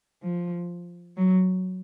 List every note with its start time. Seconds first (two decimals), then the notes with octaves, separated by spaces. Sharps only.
0.23 F3
1.17 F#3